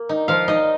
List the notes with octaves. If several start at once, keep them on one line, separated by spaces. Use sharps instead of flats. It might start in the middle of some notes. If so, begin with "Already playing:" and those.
Already playing: A#3
D#4
F3 F5
D#4 D#5